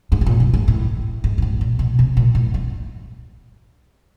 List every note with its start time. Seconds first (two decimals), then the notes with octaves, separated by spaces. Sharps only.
0.12 G#2
0.21 B2
0.26 A#2
0.40 G2
0.54 G#2
0.68 A2
1.24 G#2
1.38 G#2
1.42 A2
1.61 A#2
1.79 B2
1.99 C3
2.17 A#2
2.35 A2
2.54 G2